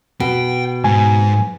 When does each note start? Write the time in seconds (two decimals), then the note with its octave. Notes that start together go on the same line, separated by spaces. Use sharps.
0.20 B2 G5
0.84 G#2 G#5